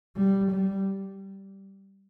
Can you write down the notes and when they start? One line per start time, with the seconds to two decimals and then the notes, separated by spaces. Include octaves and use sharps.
0.16 G3
0.52 G3